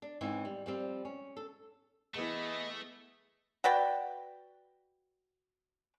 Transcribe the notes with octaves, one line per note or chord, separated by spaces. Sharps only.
D4
G#2 E3 C4 C#4 E4
G3
F3 G3 C4
C#4
A4
E3 A3 B3 G#4 B4 D#5 E7
F#4 B4 D5 G5